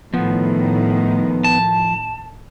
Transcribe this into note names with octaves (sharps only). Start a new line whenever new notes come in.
A2 D#3 F3 B3
A5